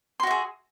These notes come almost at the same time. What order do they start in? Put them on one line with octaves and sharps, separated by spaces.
C6 F#4 E5 G#4